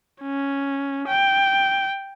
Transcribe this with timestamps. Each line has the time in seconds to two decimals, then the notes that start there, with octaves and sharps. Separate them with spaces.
0.22 C#4
1.08 G5